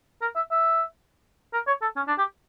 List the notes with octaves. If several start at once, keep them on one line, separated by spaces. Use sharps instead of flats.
A#4
E5
E5
A#4
C#5
A4
C#4
D4
G4